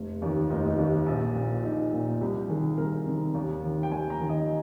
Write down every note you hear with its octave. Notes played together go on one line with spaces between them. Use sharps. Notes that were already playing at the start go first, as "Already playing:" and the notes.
Already playing: F1
D#2 D#3
F1 D#4
D#4
D#2 D#3
A#1
A#2
A#1 D#4
A#2
C2 G4
C3 D#3 G#4
C2 A#4
C3 D#3
D#2
D#3
G5
D#2 G#5
A#5
D#3
D#5